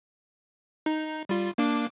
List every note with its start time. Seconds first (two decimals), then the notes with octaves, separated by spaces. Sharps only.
0.86 D#4
1.29 G3 F4
1.58 A#3 D4 D6